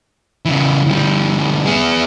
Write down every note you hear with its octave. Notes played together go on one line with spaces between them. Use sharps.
C#3 E3
D2 G3
B3 G#4